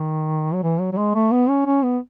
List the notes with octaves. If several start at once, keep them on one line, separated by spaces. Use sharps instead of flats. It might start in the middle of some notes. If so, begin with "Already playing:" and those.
Already playing: D#3
F#3
E3
F#3
F#3
G#3
A3
B3
C#4
C#4
B3